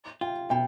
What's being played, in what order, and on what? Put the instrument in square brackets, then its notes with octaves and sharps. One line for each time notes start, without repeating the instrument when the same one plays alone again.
[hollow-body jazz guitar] F4 [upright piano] G5
[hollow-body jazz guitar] B2 [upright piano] G5